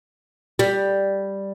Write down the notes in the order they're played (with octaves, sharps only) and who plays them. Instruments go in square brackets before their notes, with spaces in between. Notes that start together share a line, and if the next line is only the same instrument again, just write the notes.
[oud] G3